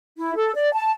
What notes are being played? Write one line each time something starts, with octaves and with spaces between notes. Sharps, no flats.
E4
A4
D5
A5